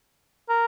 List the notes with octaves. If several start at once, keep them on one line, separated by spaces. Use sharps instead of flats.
A#4